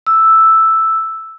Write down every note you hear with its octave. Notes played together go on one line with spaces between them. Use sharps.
E6